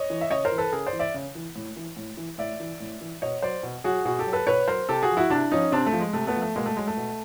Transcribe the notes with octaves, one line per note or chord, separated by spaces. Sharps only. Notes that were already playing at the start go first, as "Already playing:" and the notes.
Already playing: C#5 D#5
E3
E5
C#3 C#5 D#5
A#4 C5
E3
A4 B4
C#3 G#4 A#4
C5 D5
E3
D5 E5
C#3
E3
A2
E3
A2
E3
A2 D5 E5
E3
A2
E3
B2 C#5 D#5
F#3 C5 D5
B2
F#3 F#4 G#4
B2 F#4 G#4
G4 A4
F#3
A4 B4
B2 B4 C#5
F#3 A#4 C5
C3 G4 A4
F#4 G#4
F3
E4 F#4
C3 D4 E4
F3 C#4 D#4
C3 C4 D4
A3
F3
G#3
C3 A3
A3 B3
F3
A3
B2 G#3 A#3
A3
F#3 G#3
A3
B2